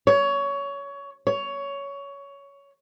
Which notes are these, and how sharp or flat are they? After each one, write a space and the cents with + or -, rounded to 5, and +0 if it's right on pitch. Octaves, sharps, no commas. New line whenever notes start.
C#5 +20
C#5 +15